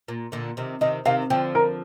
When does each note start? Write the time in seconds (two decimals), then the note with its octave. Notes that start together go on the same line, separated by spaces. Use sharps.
0.08 A#2
0.32 A#2 D3
0.57 C3 D#3
0.81 C3 D#3 D#5
1.06 C3 D#3 F5
1.30 D3 F3 G5
1.55 A#4